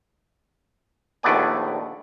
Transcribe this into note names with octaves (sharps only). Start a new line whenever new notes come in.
A#1 D#2 A3 B3 D5 G#5